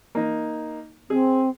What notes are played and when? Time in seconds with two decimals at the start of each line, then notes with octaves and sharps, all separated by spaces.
0.15 A#3 D#4
1.10 C4 G#4